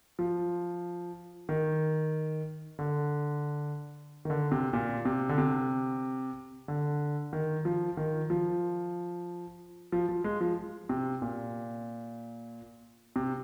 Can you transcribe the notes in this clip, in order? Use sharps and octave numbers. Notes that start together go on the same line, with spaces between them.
F3
D#3
D3
D#3
D3
C3
A#2
C3
D3
C3
D3
D#3
F3
D#3
F3
F3
F3
G#3
F3
C3
A#2
C3